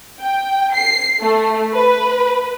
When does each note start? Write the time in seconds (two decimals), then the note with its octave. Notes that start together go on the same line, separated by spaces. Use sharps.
0.21 G5
0.73 C7
1.20 A3
1.74 B4